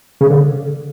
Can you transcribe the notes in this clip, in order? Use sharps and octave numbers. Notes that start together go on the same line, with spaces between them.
C#3
D3